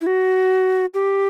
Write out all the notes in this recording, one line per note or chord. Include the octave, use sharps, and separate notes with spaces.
E4
F#4
G4